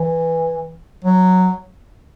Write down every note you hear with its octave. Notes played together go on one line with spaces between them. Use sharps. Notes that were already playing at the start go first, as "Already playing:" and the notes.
Already playing: E3
F#3